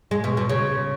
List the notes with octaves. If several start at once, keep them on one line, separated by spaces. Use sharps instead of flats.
G#3
B2
B2
C#3